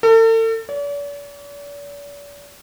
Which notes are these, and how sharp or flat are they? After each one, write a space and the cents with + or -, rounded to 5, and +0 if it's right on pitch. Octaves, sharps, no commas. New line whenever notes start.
A4 +40
D5 -45